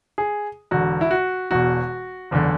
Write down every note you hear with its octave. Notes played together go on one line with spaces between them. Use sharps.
G#4
E1 E2 D3 F#4
E4
F#4
E1 E2 B2 F#4
F#1 E2 D3